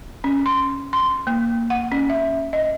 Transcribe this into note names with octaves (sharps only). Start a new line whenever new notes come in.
C#4
C6
C6
A#3
F#5
C#4
E5
D#5